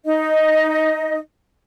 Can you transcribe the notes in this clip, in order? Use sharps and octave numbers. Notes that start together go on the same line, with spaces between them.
D#4 D#5